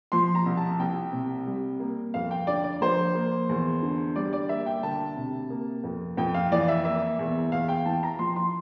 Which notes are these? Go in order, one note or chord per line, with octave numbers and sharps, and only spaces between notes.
F3 C6
A#5
C2
A5
C2 G5
C3
G3
A#3
F2 F5
G5
D3 D5
D5
F3 C5
A#3
E2
D3
G3 D5
D5
A#3 E5
G5
D2 A5
C3
A#3
F2
F2 G5
F5
E3 D5
E5
A#3 E5
E2
E2 F5
G5
E3 A5
A#5
F3 C6
C6